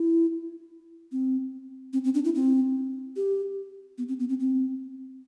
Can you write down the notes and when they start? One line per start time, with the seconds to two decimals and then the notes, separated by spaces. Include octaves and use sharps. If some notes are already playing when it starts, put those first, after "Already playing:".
Already playing: E4
1.12 C4
1.93 C4
2.04 C4
2.14 D4
2.25 E4
2.35 C4
3.16 G4
3.98 B3
4.08 C4
4.20 B3
4.29 C4
4.40 C4